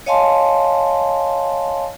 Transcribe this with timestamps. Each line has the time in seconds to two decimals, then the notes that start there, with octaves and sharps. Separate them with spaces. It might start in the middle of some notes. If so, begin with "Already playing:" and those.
0.06 C#5 D#5 F5 G#5 A5 C6